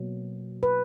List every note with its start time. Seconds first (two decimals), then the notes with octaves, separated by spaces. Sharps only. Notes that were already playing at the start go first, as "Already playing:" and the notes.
Already playing: B2 F#3 A#3
0.63 B4